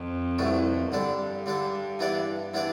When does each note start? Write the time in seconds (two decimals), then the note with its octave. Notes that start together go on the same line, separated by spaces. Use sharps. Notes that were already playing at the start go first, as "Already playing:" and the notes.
Already playing: F2
0.39 C2 B2 A3 D4
0.92 G2 D3 G3 D4 A4
1.46 D3 G3 D4 A4
1.99 E3 B3 D4 G4 D5
2.54 E3 B3 D4 G4 D5